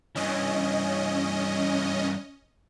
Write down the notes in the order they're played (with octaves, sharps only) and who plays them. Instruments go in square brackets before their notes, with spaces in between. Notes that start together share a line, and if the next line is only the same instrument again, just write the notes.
[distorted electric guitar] G2 E3 [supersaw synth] C#4 D#5